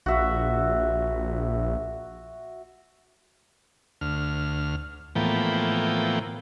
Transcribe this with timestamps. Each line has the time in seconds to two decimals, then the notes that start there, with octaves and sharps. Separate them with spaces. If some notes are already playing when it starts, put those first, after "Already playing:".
0.06 A#1 F#4 E5
4.01 D2 F6
5.15 A2 E3 F3 A#3 B3 G5